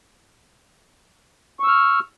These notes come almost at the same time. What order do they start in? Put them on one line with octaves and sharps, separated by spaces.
C#6 E6 F6